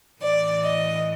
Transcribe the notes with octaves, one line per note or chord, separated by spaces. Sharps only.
A2 E3 D5
D#5